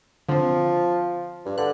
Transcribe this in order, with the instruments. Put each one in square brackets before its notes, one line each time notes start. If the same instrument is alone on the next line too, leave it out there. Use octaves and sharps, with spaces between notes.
[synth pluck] D3 C4 [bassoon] F3
[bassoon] G2
[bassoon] D3 [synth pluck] F#6